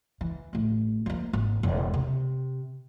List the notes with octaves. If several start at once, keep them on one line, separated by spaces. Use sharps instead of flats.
E3
A1 A2
F3 A#3
G#1
E1
C3